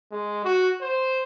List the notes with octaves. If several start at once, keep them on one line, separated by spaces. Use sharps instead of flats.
G#3
F#4
C5